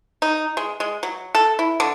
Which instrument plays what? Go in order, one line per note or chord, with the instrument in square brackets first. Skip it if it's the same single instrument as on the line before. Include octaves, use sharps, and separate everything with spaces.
[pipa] D#4
G#3
G#3
F#3
A4
E4
D3